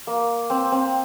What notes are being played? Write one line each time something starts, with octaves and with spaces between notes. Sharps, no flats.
A#3
C4
C4